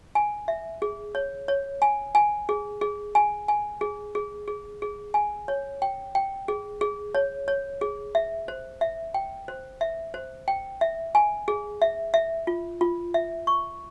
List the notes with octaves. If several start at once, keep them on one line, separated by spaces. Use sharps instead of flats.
G#5
E5
G#4
C#5
C#5
G#5
G#5
G#4
G#4
G#5
G#5
G#4
G#4
G#4
G#4
G#5
C#5
G5
G5
G#4
G#4
C#5
C#5
G#4
E5
C5
E5
G5
C5
E5
C5
G5
E5
G#5
G#4
E5
E5
F4
F4
E5
C#6